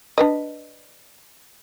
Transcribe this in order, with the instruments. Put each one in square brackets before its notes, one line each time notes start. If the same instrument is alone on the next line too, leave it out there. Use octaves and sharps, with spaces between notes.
[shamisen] D4 B4 D#5